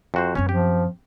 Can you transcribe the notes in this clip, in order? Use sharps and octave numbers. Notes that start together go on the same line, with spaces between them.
F2 F#4 C5
F#2 C4 C#4 C#5
F3 G4